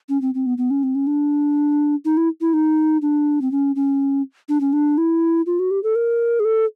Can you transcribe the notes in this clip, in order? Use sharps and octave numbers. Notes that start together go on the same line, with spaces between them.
C#4
C4
C4
B3
B3
C#4
C4
C#4
D4
D#4
E4
E4
D#4
D4
C4
C#4
C#4
D4
C#4
D4
E4
F4
F#4
G4
A4
A#4
G#4
A4